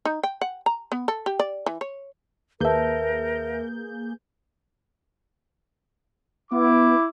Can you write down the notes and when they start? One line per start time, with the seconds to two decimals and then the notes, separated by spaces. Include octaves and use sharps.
0.05 D#4
0.23 G5
0.41 F#5
0.66 A#5
0.92 B3
1.08 A4
1.26 G4
1.39 D5
1.66 E3
1.81 C#5
2.60 D#2 A#3 G#4 A#4 B4 E5 A5 G6
6.52 B3 E4 D6